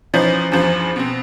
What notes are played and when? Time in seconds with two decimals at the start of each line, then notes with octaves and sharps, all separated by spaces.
0.14 E3 F3 C#4 D#4
0.52 E2 G2 F3
0.96 B2 C4